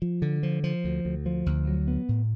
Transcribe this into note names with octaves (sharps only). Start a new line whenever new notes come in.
F3
D3
F3
F3
D2
D2
F3
D2
F#3
B3
A2